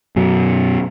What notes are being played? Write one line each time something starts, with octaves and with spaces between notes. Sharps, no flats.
F#2 B2 F#3